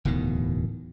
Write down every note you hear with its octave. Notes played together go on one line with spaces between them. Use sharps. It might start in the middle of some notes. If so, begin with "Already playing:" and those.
D1 E2 B2 D#3